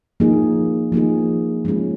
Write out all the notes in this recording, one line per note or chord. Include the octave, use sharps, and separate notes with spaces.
F3 A#3 D#4 G#4
F3 A#3 D#4 G#4
F3 G#3 C#4 G#4